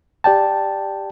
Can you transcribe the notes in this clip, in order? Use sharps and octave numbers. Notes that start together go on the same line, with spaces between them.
G4 D5 G5 A5